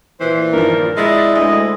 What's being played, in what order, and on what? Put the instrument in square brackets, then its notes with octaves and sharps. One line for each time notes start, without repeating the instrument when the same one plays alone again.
[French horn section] A#2 [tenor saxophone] E3 [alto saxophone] C5
[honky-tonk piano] G2 D#3 F3 [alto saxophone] A#4
[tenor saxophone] G#3 [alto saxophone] E4 [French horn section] D5 [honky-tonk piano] A6 B6 C7
[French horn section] D2 [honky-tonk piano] G#3 [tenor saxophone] D#5